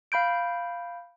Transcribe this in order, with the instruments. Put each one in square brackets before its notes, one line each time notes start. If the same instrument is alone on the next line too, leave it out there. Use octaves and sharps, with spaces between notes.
[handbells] F5 B5 G6 D7